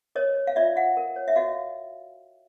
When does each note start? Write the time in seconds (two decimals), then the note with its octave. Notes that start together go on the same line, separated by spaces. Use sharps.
0.15 A#4 C#5 D#5
0.36 C#5
0.47 F5
0.56 F4 D5 E5
0.76 F4 E5 F#5
0.97 A#4
1.16 C#5
1.28 E5
1.36 F#4 D#5 F5